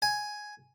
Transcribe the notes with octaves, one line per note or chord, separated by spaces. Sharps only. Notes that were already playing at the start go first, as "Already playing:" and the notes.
G#5